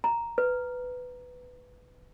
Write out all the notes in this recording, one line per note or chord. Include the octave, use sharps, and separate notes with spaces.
A#5
B4